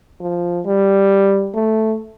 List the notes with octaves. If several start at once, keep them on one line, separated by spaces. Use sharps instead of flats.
F3
G3
A3